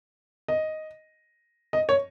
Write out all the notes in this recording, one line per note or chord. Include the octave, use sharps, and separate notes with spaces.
D#5
D#5
C#5